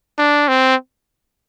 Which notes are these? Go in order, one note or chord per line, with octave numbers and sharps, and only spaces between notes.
D4
C4